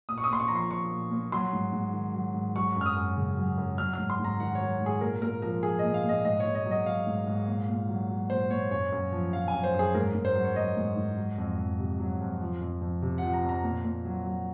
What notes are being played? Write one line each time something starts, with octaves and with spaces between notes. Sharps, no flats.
A#2 D#6
C#6
D#6
A#2 C6
C#6
F3 A#5
C6
F3 C#6
A#2
A#2
F#3 C6
G#2
G#2
D#3
F#3
G#2
F#3 C#6
F#2
F6
D#6
F#2
C#3
F#3
F#2
F#3 F6
G#2 F6
C6
G#2 A#5
D#3 F#5
C#5
F#3
G#2
G#4
A#2 A#4
A#2 A#4
F3 A#4
F3 G#4
A#2 D#5
F5
A#2 D#5
G#2 D#5
C#5
G#2
D#5
F#3
D#5
F#3 F5
G#2
G#2
A#2
A#2
F#3
F#3
A#2 C5
A#2 C#5
F#2 C#5
F#2
F3
F3 F5
G#5
F#2
C5
F#2
G#4
G#2 A#4
G#2
C5
F#3
C#5
F#3 D#5
G#2
G#2
F#3
F2
F2
C3
F#3
F2
F3
F2
F2
C3
F3 F#5
A#5
F2
A#5
A#2
A#2
F#3
F#3